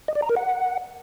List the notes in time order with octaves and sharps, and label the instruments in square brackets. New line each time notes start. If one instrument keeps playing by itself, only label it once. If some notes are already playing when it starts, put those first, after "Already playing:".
[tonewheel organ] D#5
D5
A#5
A#4
F#5